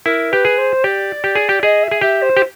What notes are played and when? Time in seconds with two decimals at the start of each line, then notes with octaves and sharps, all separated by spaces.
0.05 E4 A#4
0.31 G4 B4
0.45 G#4
0.57 C5
0.84 G4 D5
1.24 G4
1.35 G#4
1.49 G4
1.63 G#4 D#5
1.83 E5
1.91 G#4
2.01 G4 E5
2.22 C5
2.37 G4